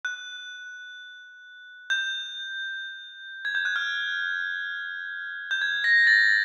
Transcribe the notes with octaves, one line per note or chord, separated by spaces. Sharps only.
F#6
G6
G#6
G6
F#6
F6
G6
G#6
A#6
A6